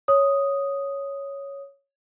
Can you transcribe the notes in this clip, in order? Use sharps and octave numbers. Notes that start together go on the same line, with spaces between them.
C#5 D#6